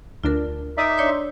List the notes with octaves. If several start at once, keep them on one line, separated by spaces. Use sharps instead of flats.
D2 D4 F4 A#4
D#4 D5 E5 D6 D#6
D4 C#5 D5 C6 G6